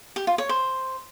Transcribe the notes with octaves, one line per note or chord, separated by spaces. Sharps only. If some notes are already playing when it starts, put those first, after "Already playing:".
G4
F4
C#5
C5